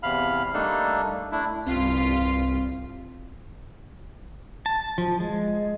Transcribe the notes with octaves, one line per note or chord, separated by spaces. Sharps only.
E2 C3 F5 B5 F6
G3 A3 A#3 D4 D#4 A4
A3 D4 E4
C2 G2 C4 F4 B6
A5
F3
G#3